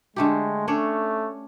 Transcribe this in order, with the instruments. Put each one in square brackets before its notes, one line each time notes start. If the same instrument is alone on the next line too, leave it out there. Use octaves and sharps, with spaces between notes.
[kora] D3 A3 G4 [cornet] G#3
[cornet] A3 [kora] C#4 D4 C#5